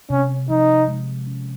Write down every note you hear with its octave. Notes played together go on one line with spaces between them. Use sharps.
C3 C#4
F3 D#4
G#3
C#4